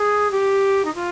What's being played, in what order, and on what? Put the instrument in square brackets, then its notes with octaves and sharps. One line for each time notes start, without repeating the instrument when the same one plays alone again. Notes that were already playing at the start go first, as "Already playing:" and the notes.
Already playing: [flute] G#4
G4
D#4
F4